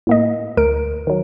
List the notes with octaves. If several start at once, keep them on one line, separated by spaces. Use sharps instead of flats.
A2 A#3 D#5
D2 A#4 D7
D#3 F#3